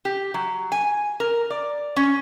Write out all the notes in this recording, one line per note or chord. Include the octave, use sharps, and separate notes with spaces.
G4
F#3
G#5
A#4
D5
C#4